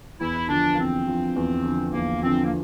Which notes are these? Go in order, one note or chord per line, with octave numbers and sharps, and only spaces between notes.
E2 E4
D3 F3 D4
A#3
E2 C4
D3 F3
E2
D3 F3
E2 A#3
D3 F3 C4
A#3